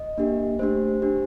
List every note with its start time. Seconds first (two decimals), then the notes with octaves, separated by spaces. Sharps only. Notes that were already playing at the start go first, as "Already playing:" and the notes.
Already playing: D#5
0.18 A#3 D4 G4
0.59 A3 D4 G4 C5
1.02 D4 G4